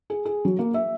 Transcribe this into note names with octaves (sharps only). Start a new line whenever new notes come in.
G#4
G#4
F#3
A#3
E5